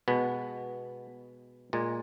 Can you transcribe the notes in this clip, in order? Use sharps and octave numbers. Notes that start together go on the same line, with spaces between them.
B2 G#3 B3
A#2 G#3